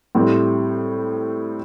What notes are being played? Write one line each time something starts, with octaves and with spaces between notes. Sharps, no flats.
A2 G3 C4 E4